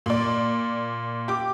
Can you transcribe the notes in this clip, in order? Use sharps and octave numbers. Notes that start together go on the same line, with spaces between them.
A#2 D5
G4 D6